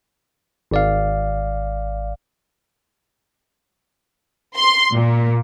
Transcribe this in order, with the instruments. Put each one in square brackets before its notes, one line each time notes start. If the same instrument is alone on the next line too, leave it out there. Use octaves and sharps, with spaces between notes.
[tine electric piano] G#1 D5 F5
[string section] C6
A#2